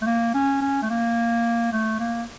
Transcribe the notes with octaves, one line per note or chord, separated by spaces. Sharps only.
A3
A#3
C#4
C#4
A3
A#3
A3
A#3